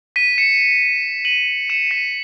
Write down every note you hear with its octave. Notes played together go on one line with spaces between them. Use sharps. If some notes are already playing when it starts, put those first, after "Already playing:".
B6 D#7
C#7 E7
D#7 F#7
C#7 E7
B6 D#7